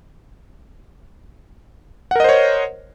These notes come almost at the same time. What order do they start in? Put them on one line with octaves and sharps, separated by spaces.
F#5 A#4 D#5 C5 C#5